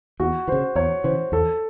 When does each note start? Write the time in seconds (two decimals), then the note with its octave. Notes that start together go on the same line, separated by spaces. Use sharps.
0.20 E2 F#4
0.48 C#3 E3 C5
0.75 E2 C#5
1.04 C#3 E3 C5
1.32 E2 A4